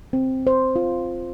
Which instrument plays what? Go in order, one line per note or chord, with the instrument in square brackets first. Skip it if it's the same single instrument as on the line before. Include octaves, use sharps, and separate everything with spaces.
[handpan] C4
C5
F4